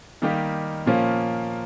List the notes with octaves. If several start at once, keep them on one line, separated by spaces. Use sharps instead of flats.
D#3 G3 A#3 D#4 G4
A#2 F3 A#3 C#4